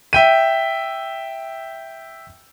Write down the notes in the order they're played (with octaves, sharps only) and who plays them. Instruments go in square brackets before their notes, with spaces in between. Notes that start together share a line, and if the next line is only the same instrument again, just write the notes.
[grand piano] E5 G5 D#7